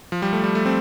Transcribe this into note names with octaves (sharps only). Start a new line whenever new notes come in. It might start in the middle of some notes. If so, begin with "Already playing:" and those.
F3
G3
A3
G3
A3
C4